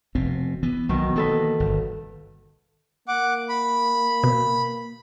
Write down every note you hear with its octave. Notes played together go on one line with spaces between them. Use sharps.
F1 B2 C4
E3 B3
B1 B2 D#3 F#3 B3
E3 A#3 D#4 A4 B4
G1
A#3 F#5 D6
B5
B2